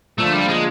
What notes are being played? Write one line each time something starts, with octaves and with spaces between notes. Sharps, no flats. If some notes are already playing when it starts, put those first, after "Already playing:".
D3 F3 A3 A#3 D4 F4
G3
G#3